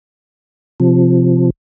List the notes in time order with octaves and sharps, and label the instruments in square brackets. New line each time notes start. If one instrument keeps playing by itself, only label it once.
[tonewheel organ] C3 F3